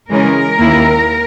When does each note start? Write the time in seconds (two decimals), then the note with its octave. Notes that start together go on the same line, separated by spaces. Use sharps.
0.10 C#3 E3 G#3 C#4 A#4
0.60 D#2 D#3 A#3 E4